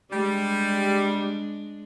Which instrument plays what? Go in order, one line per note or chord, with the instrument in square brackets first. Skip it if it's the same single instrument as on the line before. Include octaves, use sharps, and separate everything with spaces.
[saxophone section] G3 [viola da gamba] G#3 D4